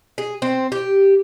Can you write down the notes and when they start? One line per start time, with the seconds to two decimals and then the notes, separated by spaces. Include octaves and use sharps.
0.18 G#4
0.42 C4
0.72 G4